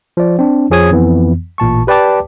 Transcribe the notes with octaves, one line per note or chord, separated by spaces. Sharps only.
F3 D5
C4 D4
F2 F3 G#4 C#5 D#6 G#6
F2 E3 B3
A1 A#2 A5 C#6
G4 B4 D5 G5 A5 D6